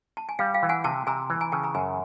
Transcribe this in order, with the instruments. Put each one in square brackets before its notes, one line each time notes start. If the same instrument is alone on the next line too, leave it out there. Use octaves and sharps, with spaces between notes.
[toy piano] A5
G#5
[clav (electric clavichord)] G3 [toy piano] F5 G5
[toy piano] F5 G5
[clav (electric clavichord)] E3
[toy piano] F#5 G#5
[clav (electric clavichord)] C3 [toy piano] G5 A5
[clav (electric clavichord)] C3 [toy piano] G#5 A#5
[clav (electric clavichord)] E3
[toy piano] G#5 A#5
[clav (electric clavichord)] C#3 [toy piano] G5 A5
[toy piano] G#5 A#5
[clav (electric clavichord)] F#2 [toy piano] G#5 A#5